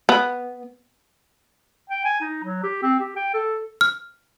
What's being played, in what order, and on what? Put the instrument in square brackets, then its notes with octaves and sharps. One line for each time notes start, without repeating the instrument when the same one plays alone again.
[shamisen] B3
[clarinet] G5
G#5
D#4
F#3
G4
C4
G4
G5
A4
[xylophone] F6